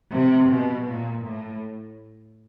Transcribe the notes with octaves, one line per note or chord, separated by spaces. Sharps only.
C3
B2
A#2
A2